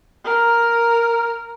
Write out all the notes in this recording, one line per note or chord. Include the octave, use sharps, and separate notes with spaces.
A#4